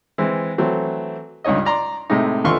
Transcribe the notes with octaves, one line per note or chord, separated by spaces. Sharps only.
E3 G#3 C4
E3 F#3 A3 C4
C#2 G2 D#4 C#5 D#5
D5 A#5 C6
A2 C3 G#3 D#4
D#2 D3 E3 F4 C6 C#6